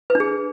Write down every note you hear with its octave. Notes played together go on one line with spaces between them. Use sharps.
B4
D4
G#4